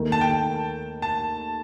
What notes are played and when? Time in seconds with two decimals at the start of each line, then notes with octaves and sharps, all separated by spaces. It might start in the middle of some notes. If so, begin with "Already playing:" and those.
Already playing: D#2 D#3 A3
0.12 A5
0.21 G5
1.02 A5